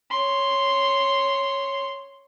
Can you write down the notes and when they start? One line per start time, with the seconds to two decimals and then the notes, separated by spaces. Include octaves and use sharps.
0.11 C#5 C6